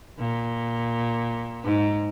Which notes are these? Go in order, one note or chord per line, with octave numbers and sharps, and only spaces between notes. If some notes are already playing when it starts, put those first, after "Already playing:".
A#2
G#2